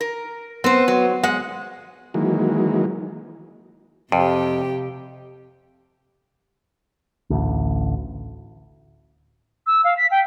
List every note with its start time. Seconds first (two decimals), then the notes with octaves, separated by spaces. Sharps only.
0.01 A#4
0.64 B3 C4 C5
0.88 F#3
1.23 G#3 F#5
2.14 D#3 E3 F#3 G#3 A#3
4.12 F2 C3 G4
7.30 A1 D2
9.67 E6
9.84 F5
9.97 B6
10.11 G5